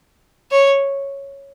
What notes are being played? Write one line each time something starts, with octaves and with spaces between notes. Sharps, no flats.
C#5